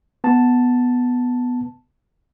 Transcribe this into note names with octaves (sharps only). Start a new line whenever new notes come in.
B3 A5